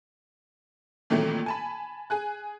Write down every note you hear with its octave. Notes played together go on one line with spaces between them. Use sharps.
A#2 D#3 E3 F#3 A3 C4
G#5 A5 B5
G#4 G#5 F#6